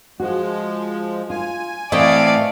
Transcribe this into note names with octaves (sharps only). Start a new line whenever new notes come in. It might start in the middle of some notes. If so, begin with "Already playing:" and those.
F3 G#3 F#4
F4 G#5
A2 E3 A3 C4 D5 D#5 F5